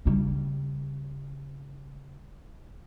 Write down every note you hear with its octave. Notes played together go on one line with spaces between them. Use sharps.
C#3 G3